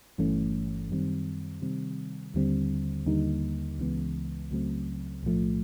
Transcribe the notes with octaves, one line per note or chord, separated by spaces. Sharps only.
G1 G2 E3 A3 C#4
F#2 D#3 G3 C4
C3 D#3 G3 C4
D#2 D3 G3 C4
D#2 D3 G3 A#3 D#4
C#2 C#3 E3 G#3 B3
C#2 C#3 F#3 A3 C4
B1 A2 F3 A3